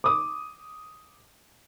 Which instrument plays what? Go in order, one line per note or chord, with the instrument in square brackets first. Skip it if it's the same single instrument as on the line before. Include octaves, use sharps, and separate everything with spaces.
[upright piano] D6 D#6